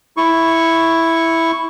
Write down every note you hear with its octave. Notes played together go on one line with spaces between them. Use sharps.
E4 C#6